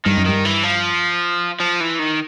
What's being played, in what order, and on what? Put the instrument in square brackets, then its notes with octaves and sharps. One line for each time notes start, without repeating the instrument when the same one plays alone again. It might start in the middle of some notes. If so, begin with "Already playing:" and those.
[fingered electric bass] G2 [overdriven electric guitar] D#3
[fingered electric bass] F#2
[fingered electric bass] G2 [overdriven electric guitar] D#3
[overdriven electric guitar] E3
F3
F3
E3
D#3